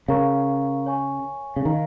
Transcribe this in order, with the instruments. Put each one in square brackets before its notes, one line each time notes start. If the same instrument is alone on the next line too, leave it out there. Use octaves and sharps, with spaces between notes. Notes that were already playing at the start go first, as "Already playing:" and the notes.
[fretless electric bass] C#3 [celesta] A#4 F5 A#5 C#6
[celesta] C#5 G#5 C#6
[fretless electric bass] C#3
[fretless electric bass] D#3 [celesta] D#4 A#4 F5 A#5